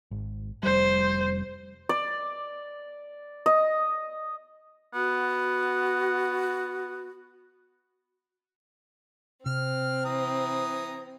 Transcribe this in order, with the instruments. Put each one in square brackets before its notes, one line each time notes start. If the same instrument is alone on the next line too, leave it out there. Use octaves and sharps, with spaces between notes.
[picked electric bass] G#1
[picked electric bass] F1 G3 [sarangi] C5
[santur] D5
D#5
[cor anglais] B3 [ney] F#4
[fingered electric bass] C3 [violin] C4 [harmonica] F6
[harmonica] E3 A#5 D#6